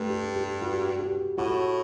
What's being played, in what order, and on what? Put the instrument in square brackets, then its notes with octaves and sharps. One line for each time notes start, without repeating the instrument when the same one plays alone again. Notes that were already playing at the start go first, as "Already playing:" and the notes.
Already playing: [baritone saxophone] G2 [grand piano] A3
[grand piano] G4
G4
F#4
G4
[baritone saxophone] A2 [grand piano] F#4